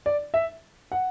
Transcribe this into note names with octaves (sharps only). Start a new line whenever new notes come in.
D5
E5
F#5